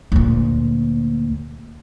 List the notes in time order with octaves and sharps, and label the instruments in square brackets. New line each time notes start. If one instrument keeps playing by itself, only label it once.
[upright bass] D2 A#2